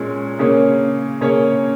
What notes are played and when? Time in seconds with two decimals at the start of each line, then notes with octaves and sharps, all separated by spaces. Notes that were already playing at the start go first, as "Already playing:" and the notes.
Already playing: A#2 G#3 C#4 C#5
0.39 C#3 A#3 C#4 G#4 C#5
1.21 C#3 A#3 C#4 G#4 C#5